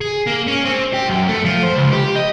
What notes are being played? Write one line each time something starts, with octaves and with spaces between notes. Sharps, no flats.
G#4
A#3
C#4
C4
G4
F#2
A3
F3
C5
C#2
G4
D#5